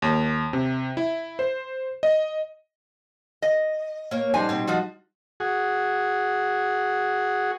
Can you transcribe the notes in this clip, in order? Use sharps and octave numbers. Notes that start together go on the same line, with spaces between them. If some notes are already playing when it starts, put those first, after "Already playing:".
D#2
C3
E4
C5
D#5
D#5
A#3 C#5
G3 D4 D#4 C5 G#5
B2 C4
F3 F4 F#4 D#5
F#4 G#4